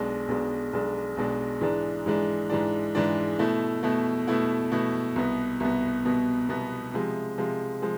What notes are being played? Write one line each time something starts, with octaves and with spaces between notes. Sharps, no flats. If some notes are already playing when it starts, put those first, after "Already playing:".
Already playing: B1 B2 G#3 D4
B1 B2 G#3 D4
B1 B2 G#3 D4
B1 B2 G#3 D4
G#2 E3 G#3 D4
G#2 E3 G#3 D4
G#2 E3 G#3 D4
G#2 E3 G#3 D4
B2 A3 E4
B2 A3 E4
B2 A3 E4
B2 A3 E4
C2 B2 B3
C2 B2 B3
C2 B2 B3
C2 B2 B3
C3 F3 G#3
C3 F3 G#3
F3 G#3